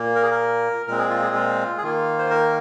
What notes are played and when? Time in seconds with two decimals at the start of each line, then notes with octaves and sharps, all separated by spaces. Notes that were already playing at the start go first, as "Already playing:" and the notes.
Already playing: A#2 A#3
0.15 A#4
0.23 G#4
0.31 A#4
0.87 A#2 G#3 C4 A#4
0.98 G#4
1.10 F4
1.21 G#4
1.35 F4
1.78 G#4
1.82 D#3 A#3 F4
2.18 C5
2.30 A#4